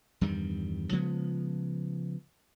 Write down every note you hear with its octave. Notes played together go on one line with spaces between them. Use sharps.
E2 G2 D#3 G3
C#3 F3 G#3 B3